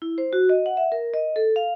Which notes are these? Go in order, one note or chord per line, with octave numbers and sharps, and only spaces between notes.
E4
C5
F#4
D#5
F#5
E5
A#4
D#5
A4
F5